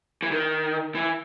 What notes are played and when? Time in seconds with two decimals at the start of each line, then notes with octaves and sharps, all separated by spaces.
0.22 E3
0.31 D#3
0.95 E3